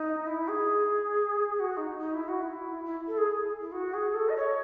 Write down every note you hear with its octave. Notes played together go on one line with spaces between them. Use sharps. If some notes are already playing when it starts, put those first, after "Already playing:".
Already playing: D#4
E4
G#4
G#4
F#4
D#4
D#4
E4
F#4
E4
E4
A4
G#4
E4
F#4
G#4
A4
D#5
C#5